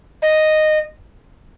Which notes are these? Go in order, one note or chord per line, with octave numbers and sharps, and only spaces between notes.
D#5